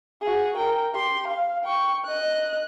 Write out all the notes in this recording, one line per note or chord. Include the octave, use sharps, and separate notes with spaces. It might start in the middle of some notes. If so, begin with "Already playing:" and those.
F#4 G#4
A#4 G5
G4 C6
F5
G5 C#6
D#5 F#6